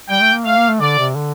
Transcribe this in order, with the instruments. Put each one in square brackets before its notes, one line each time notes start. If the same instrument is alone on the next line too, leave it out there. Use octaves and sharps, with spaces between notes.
[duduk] G3 [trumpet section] G5
[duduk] A3
A#3
[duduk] A3 [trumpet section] F5
[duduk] A#3
A3
[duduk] D3 [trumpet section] D5
[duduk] C3
D3